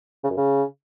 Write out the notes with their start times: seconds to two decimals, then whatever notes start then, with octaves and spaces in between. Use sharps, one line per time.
0.24 C#3
0.30 F#2
0.37 C#3